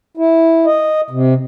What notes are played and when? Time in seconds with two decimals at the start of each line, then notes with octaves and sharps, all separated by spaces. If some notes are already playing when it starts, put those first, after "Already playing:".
0.17 E4
0.66 D#5
1.10 C3